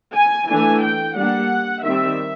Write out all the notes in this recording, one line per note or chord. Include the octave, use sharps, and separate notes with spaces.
G#5
E3 A3 D4 G#5
G5
G3 A#3 D4 F#5
D#3 G3 C4 E5